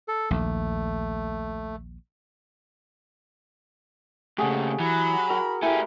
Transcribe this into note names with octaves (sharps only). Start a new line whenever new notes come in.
A4
A#1 D#2 A3
F2 A#2 C#3 A3 G4 G#4 F#5
E3 F#3 B5
F#4 A#4
A3 E4 G4 A#4 G#5